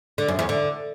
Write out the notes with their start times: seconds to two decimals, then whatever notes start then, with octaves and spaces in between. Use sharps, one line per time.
0.18 D3
0.28 F#2
0.39 E2
0.49 D3